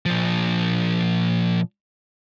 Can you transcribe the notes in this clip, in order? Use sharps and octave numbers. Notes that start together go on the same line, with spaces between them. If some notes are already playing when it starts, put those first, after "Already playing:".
A#2 F3